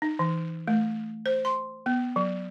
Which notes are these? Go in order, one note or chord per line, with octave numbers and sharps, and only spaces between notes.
D#4
E3
A3
C5
C6
B3
F#3